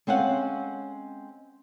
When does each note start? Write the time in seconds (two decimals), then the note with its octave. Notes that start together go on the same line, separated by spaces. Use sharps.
0.07 G#3 C4 C#4 F5 F#5